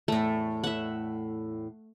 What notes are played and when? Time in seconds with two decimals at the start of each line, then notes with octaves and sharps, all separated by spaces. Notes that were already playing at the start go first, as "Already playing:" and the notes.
0.08 E2 A2 A3
0.64 E5 F#5